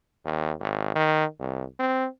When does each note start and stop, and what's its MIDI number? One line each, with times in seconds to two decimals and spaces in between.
0.25 0.52 39
0.61 0.94 32
0.95 1.25 51
1.39 1.64 36
1.79 2.07 60